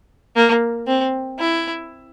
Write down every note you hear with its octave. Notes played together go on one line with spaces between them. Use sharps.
A#3
C4
E4